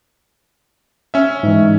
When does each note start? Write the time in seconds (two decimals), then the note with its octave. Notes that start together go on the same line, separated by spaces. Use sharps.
1.14 C#4 E5
1.43 G#2 E3